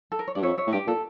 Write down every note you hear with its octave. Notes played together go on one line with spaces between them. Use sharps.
A4
A#4
C#5
G2 D5
F2 C#5 E5
C#5 E5
A2
G2 G4
A#2 A4